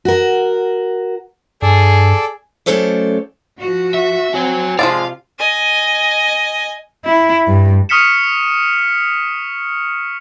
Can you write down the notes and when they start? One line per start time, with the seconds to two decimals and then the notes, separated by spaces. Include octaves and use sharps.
0.05 F#4 A#4
1.62 G2 G#4 A4 D5
2.66 F#3 A3 C#4 A4 C5 D5
3.61 F3 F#4
3.94 E5
4.34 C4 F#4 C#5 G#5
4.79 C3 F3 F#3 G#3 F4 D5 F5
5.39 D#5 G#5
7.05 E4
7.47 G2
7.89 C#6 D#6 F6 B6 C#7 E7